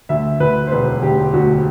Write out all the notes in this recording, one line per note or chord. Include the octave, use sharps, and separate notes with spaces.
D2 E5
D2 B4
C5
E1 B4
D2 G4
D2 F#4